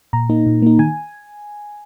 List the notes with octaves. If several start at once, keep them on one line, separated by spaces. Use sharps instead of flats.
A#2 A#5
A#3 D#4
A#2
A#3 D#4
D#3 G#5